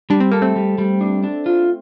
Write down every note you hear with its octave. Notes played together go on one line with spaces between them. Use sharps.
G3 D4
C4
A#3 A4
A3 C4
G3
G3
D4
D4
F4